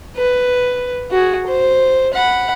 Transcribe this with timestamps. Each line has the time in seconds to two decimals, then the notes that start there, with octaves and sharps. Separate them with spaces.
0.17 B4
1.11 F#4 G#4
1.47 C5
2.14 F#5 B5